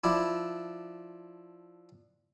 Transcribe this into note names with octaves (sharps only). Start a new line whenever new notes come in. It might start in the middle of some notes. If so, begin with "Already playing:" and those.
F3 D4 E4